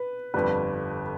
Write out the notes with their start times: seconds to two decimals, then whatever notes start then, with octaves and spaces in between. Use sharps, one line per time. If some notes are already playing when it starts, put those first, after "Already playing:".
Already playing: B4
0.34 G1 F2 D3 G3 B4